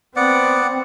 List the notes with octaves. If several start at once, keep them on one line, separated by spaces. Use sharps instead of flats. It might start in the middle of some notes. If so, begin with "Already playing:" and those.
B3 C4 D5 F#5